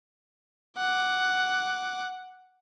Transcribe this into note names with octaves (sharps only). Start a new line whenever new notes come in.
F#5 D6